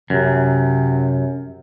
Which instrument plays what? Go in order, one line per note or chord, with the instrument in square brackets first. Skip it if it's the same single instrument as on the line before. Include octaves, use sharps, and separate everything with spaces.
[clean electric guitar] F#2 [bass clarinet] C3